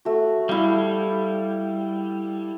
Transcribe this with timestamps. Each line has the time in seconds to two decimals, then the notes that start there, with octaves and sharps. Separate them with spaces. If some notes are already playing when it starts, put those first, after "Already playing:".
0.05 A3 F#4
0.49 G3 E4 F5